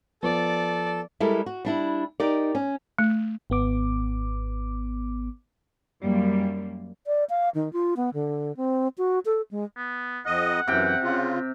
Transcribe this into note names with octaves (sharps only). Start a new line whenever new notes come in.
F3 B3 A4 D5
G3 G#3 E4 A4 A#4
F#4
G3 D4 E4
D#4 G4 A#4 D5
C#4
A3
G#1 B3 D6
F#2 G3 A#3
D5
F5
D#3
F4
B3
D3
C4
F#4
A4
G#3
B3
F2 D#5 F#5
F#2 C3 E3 G5
C#3 F4